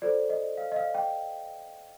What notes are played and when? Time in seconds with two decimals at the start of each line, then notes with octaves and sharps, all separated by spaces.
0.02 F4 A4 C5 D5
0.30 D#5
0.57 F5
0.72 D#5
0.76 F5
0.94 G5